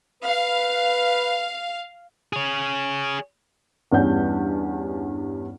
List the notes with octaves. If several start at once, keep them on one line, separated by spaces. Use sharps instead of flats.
B4 F5
G#4 C#5
E2 G2 G3 C#4 F#5 G6